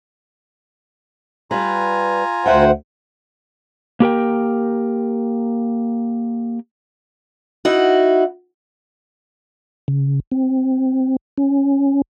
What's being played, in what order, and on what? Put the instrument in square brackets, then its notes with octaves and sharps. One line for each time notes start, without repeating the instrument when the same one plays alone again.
[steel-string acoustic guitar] G3 B4 [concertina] F4 G#5 A#5
[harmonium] D2 C5 F#5 [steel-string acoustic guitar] B4 E5 G5
[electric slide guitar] A#3 G4 A#4 G5
[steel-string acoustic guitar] D#4 E4 F#4
[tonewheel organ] C#3
C4
C#4